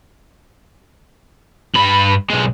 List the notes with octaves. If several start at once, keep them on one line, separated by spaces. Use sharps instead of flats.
G2 B5
B1 G#3